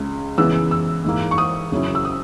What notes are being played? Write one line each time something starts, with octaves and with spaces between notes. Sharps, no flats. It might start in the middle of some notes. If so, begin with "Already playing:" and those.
Already playing: C#2 C#3 G#3
C#3 E3 G#3 B3 E6
E6
G#2 E3 A#3
C#6
D#6
D#2 C#3 F#3 C#4 E4
E6
D#6